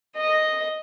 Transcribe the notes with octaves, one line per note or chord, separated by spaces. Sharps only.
D#5